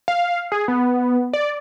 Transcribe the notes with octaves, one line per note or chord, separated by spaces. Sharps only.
F5
G#4
B3
D5